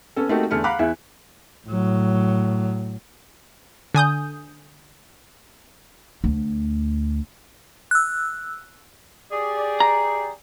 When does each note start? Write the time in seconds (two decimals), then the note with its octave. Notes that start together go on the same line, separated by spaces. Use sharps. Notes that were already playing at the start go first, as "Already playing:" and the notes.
0.16 B3 C#4 A4
0.29 A3 A#3 C4 D#4 F#4 G4
0.51 E2 D3 A3 F6 C#7
0.64 F5 F#5 A#5 B5 D6 F#6
0.79 E2 E4 E5
1.67 A2 F#3
3.95 D3 G#5 D#6 G6
6.24 D2
7.91 E6 F#6
9.31 G4 G#4 D5
9.80 A#5